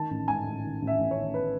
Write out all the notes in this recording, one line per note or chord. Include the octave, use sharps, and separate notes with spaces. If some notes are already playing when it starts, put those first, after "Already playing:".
Already playing: D#3 A5
A1
G#2 G#5
A1
D#3
A1
E5
A1
C#5
D#3
B4